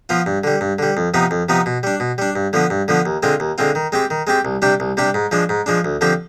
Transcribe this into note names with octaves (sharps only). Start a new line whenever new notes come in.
F3 B3 F4
G2
D3 G3
G2
D3 G3
F2
C3 F3 B3 D#4
F2
C3 F3 B3 D#4
B2
G3 D4
B2
G3 D4
G2
D3 F3 B3
G2
D3 F3 B3
D#2
D3 G#3 C4 F4
D#2
D3 G#3 C4 F4
D#3
G#3 C4 G4
D#3
G#3 C4 G4
C2
C3 G3 D4 G4
C2
C3 G3 D4 G4
G#2
F3 G#3 D4
G#2
F3 G#3 D4
D2
D3 F3 C4 G4